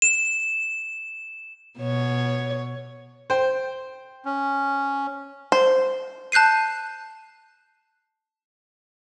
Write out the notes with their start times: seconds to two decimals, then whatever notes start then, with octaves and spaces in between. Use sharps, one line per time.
0.02 E7
1.80 B2 C#5
3.30 C5 G5
4.25 C#4
5.52 C5
6.32 A5 F#6 G6 C7 D#7